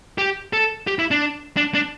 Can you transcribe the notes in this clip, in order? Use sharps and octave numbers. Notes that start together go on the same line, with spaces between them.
G4
A4
G4
E4
D4
D4
D4